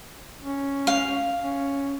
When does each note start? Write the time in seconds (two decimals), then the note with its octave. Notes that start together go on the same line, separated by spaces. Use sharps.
0.42 C#4
0.87 F5
1.43 C#4